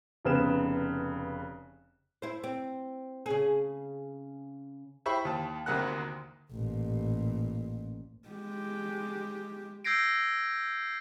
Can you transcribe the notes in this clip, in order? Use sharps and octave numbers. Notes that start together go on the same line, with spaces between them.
F1 C#3 B3 E7
E4 C5
C4
C#3 G#4
E4 G4 C5 E5 B5 C#6
D#2 A5
G#1 D2 C3 A#3 F#5 F#6
A1 A#2
G#3 G4
E6 G6 G#6 A#6 C7 D7